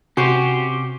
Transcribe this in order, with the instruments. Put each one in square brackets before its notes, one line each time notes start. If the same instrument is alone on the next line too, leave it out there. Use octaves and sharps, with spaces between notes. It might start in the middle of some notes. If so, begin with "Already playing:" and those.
[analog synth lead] C3 [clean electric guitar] C#4 G4 C5 [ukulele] F#4